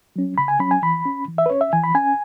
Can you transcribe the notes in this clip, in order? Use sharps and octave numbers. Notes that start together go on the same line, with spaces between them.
F#3 C#4
C#3 B5
G#5
F#3 C#4 B5
G#5
E3 B5
C#4
E3
E5
B4
C#4 C#5
E5
E3 G#5
B5
C#4 G#5